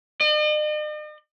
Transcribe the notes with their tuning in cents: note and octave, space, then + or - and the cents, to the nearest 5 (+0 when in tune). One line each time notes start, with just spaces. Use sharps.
D#5 -45